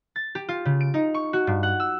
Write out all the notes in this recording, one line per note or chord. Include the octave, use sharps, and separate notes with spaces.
A6
G4
F4
C#3
D7
D#4
C#6
F#4
G2
F#5
E6